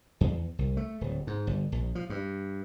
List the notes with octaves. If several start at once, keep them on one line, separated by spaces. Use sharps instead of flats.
E2
C2
A3
D1
G#2
G1
A#1
F3
G2